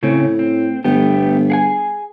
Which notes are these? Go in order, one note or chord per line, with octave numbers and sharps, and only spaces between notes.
A2 C#3 C4 C#4
C4
G1 A3 B3 G4
G#4 F#5 G#5